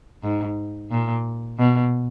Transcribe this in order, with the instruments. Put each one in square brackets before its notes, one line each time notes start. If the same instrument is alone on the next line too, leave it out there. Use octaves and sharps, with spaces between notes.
[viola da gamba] G#2
A#2
B2